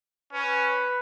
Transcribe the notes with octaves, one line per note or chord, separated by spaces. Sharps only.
C#4 B4